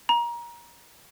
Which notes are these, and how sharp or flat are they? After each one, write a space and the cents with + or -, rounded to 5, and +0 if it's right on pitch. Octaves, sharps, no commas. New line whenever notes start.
A#5 +25